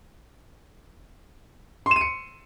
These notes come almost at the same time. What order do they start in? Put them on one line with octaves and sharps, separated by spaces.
C6 E7 D#7 C#7